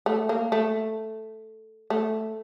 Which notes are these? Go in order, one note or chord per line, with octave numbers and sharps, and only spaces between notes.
A3
A#3
A3
A3